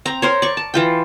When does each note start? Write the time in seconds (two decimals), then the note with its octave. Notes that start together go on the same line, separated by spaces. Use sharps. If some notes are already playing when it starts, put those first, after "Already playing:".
0.05 C4 A#5
0.22 A#4 C5 C#5
0.42 D5 C#6
0.57 A5
0.74 E3 F4 G5